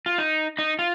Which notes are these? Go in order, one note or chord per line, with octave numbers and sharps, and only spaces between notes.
F4
D#4
D#4
F4